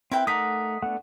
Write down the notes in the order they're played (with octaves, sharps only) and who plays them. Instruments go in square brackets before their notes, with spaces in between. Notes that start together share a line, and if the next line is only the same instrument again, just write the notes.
[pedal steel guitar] C4 [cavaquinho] E4 B4 G5
[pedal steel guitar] A3 F#5 [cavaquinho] D#4 A#4 D5 [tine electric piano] D#6 B6
[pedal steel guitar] A3 B3 D4 [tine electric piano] F#5